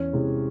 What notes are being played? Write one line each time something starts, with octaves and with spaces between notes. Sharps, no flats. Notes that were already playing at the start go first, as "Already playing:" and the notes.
Already playing: E2 C#4
C3 E3 G#3